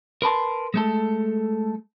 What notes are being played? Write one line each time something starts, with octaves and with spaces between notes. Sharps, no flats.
A#4 B4 A5 C6
G#3 A3 A4